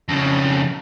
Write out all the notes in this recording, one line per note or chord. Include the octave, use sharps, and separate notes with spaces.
F2 C#3